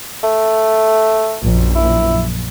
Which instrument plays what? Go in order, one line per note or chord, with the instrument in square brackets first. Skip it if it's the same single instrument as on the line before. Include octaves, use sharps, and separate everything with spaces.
[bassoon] A3
[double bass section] A#1 F#2
[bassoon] E4